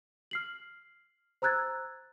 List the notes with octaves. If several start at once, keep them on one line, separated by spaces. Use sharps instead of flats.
F6 C7 F#7
C5 A#5 E6 F#6 G#6 A6